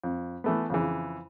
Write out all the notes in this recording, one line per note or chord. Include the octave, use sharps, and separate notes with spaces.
F2
E3 A3 B3
F2 C#3 E3